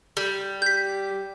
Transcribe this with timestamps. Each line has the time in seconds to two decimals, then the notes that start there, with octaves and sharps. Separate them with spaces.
0.17 G3
0.62 G4 G6 B6